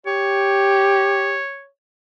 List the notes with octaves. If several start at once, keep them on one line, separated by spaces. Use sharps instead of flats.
G4 C#5